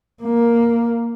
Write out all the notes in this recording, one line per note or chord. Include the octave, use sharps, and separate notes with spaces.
A#3